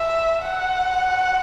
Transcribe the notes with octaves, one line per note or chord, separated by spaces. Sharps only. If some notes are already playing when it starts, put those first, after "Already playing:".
Already playing: E5
F#5